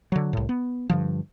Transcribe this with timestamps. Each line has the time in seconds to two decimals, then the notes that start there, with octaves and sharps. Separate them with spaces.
0.12 D3 F#3
0.33 C2 A2
0.49 B3
0.90 G2 D3 F3